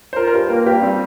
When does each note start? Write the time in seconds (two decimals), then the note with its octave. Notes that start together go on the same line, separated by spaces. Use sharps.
0.13 C5
0.16 F4 A#4
0.27 A#4
0.33 G2 C5
0.50 A#3 A#4
0.66 G2 G4
0.82 G3 C4